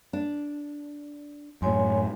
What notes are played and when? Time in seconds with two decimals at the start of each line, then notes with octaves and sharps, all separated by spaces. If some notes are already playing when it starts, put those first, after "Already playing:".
0.13 D4
1.62 F#2 A2 C#5 G#5 C6